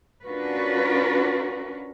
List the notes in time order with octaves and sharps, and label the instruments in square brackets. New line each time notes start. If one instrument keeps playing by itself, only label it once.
[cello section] C#4 D4 F4 F#4 A#4 B4